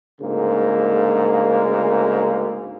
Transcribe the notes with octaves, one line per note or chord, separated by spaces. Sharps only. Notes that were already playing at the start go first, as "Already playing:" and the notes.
D2 G#2 C#3 A#3